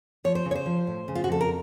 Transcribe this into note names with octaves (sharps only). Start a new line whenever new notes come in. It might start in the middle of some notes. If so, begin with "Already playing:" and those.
F3 C#5
C5
C#3
C#5
C5
F3
A2
C#3
F4
F#4
F2 A4
A#4